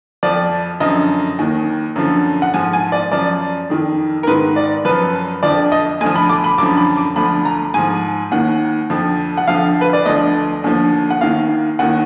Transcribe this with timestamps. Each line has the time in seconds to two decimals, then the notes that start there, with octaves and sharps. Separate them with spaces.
0.23 F2 F3 D5
0.80 F#2 D3 F3 D#5
1.39 D#2 D#3
1.96 F#2 D3 F3
2.42 F#5
2.54 G#2 F3 G#5
2.73 G#5
2.92 D5
3.12 F#2 F3 D5
3.70 F2 D#3
4.23 A#4
4.27 G#2 D#3 B4
4.56 D5
4.85 F#2 F3 B4
5.43 F2 D3 F3 D5
5.72 D#5
6.01 D2 D3 F3 G#5
6.16 B5
6.29 D6
6.44 B5
6.58 F#2 D3 F3 D6
6.77 B5
6.97 D6
7.16 D2 D3 F3 B5
7.45 A#5
7.74 G#2 F3 G#5
8.31 D#2 D#3 F#5
8.90 F2 D3 F3
9.37 F#5
9.47 F2 D3 F3 F5
9.81 B4
9.93 D5
10.06 D2 D3 F3 D#5
10.64 D#2 D3 F3
11.10 F#5
11.21 D#2 D#3 F5
11.79 D#2 D#3 F#5